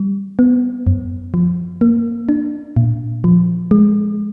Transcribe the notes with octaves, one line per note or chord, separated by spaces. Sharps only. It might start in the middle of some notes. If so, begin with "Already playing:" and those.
Already playing: G3
B3
F#2
F3
A#3
D4
A#2
F3
G#3